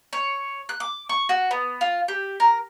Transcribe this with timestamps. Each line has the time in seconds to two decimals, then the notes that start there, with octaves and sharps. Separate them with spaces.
0.13 C#5
0.69 F#6
0.80 D6
1.09 C#6
1.29 F#4
1.51 B3
1.81 F4
2.08 G4
2.40 A#4